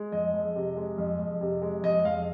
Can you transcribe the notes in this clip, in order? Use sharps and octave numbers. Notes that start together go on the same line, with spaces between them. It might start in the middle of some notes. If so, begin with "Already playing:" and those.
Already playing: G#3
F2 D#5
F2
C3
G#3
F2
F2
C3
G#3
F2 D#5
F2 F5